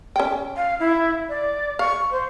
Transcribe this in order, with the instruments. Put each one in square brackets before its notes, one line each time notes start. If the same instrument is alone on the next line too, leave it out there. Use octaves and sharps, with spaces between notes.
[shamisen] C#4 G5
[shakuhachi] F5
E4
D5
[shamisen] F5 [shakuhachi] C#6
[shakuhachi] C5